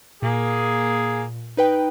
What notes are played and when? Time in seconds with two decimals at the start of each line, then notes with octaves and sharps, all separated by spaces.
0.22 A#2 A#3 G#4
1.57 D#4 B4 G5